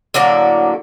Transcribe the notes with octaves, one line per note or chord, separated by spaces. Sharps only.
A2 D3 F#3 A#3